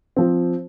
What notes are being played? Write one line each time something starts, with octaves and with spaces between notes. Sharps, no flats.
F3 C4